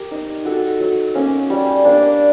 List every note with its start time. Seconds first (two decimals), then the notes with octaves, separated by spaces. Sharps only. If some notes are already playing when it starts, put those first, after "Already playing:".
Already playing: G4 A#4
0.11 D#4
0.45 F#4 A4
0.80 F#3
1.15 A#3 C#4
1.50 G3
1.85 A#3 D4